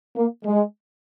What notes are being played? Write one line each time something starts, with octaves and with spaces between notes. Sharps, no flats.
A#3
G#3